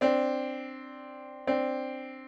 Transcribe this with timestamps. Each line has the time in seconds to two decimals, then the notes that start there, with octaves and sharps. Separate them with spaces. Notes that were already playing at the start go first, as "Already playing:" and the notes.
0.01 C4 D4
1.47 C4 D4